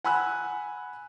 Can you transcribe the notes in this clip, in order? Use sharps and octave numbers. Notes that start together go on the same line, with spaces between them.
F#5 G#5 B5 E6 F#6